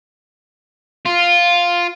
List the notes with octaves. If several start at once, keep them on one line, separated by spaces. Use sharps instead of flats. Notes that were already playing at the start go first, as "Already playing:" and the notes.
F4